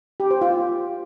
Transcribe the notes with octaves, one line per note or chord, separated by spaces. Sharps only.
G4
C5
F4